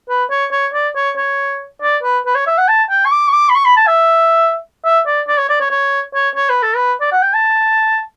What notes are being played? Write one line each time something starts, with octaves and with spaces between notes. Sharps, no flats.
B4
C#5
C#5
D5
C#5
C#5
D5
B4
B4
C#5
E5
F#5
A5
G5
C#6
D6
C#6
D6
B5
C#6
B5
A5
E5
E5
D5
D5
C#5
D5
C#5
C#5
C#5
C#5
B4
A4
B4
D5
F#5
G5
A5